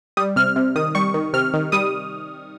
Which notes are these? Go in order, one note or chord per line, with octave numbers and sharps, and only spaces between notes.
G3 D#6
C3 F6
C3
D#3 D#6
G3 C#6
D#3
C3 F6
D#3
G3 D#6